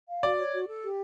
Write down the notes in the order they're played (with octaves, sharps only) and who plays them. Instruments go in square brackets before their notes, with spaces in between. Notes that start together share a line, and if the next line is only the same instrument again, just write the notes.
[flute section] F5
[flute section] F#4 [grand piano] D5
[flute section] C#5
F#4
A4
G4